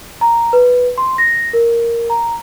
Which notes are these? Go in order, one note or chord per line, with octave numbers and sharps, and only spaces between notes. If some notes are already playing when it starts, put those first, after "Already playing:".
A#5
B4
C6
A#6
A#4
A#5